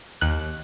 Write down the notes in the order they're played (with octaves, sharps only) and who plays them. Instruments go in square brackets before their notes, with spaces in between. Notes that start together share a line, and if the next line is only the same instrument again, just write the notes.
[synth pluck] D#2 F#6